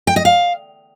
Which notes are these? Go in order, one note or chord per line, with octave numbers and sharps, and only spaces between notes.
G5
D#5
F5